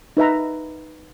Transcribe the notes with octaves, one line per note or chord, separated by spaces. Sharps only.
D#4 B4 E5 A#5